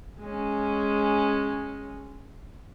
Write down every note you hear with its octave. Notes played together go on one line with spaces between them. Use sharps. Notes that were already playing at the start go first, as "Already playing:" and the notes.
G#3 C#4